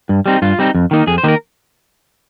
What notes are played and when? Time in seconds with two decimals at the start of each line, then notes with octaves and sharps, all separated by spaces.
0.09 G2
0.26 G3 C4 D#4
0.42 G2 F4
0.59 G3 C4 D#4
0.75 F2
0.91 D#3 A#3 D#4
1.07 F2 G#4
1.18 C5
1.23 D#3 A#3 D#4 A#4